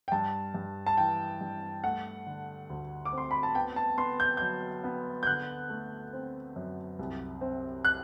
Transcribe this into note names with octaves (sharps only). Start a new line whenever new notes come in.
G5
G2 A5
G2
A5
E3 G5
G2
A3 F#5
D3
D2
D6
C4
C6
B5
A5
B3 G5
A5
B3 C6
G6
F#3 G6
B3
G6
D3 F#6
A3
C4
F#2
C2
C4
F#6